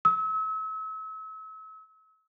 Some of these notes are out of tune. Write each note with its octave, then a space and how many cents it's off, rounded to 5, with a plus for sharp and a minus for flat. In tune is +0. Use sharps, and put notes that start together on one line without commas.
E6 -40